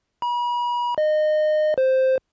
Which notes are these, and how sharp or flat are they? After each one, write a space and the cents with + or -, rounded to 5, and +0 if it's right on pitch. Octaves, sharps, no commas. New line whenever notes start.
B5 -40
D#5 -25
C5 +0